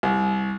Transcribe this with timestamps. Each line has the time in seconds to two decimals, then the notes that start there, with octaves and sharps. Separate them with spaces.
0.03 C2